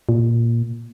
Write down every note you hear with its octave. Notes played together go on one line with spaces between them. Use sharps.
A#2